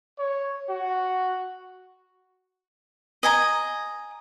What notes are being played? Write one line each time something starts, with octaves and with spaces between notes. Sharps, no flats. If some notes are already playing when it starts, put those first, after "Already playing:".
C#5
F#4
D#5 G#5 A#5